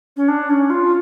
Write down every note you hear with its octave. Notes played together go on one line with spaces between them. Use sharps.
C#4
D4
C#4
F4